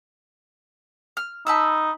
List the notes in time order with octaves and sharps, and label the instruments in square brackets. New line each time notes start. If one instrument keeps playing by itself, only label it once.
[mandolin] F6
[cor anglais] D#4 [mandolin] A5 B5 E6